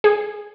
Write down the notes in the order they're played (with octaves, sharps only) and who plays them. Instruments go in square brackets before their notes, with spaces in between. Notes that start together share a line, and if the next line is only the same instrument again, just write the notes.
[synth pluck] G#4